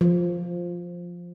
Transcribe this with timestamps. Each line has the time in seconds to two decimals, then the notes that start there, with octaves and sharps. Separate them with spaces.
0.01 F3